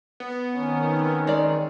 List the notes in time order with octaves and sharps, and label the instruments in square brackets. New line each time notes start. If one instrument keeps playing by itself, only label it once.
[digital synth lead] B3
[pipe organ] D#3 [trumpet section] C4 C#4 A#4
[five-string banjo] G#3 D5